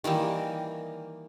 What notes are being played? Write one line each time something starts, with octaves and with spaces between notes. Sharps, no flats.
D#3 E3 G3 A#3